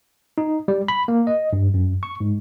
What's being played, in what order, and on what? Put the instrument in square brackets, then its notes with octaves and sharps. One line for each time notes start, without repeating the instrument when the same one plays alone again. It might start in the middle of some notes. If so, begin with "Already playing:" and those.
[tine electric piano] D#4
G3
B5
A#3
D#5
G2
F#2
C#6
G#2